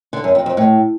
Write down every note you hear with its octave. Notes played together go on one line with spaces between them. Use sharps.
D3
F#2
F2
F2
A2